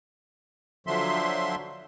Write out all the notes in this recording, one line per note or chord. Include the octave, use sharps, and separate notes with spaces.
D3 F3 F#3 E5 C6